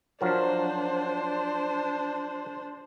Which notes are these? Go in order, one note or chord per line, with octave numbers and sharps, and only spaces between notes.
F3 F#3 D4 A#4 C5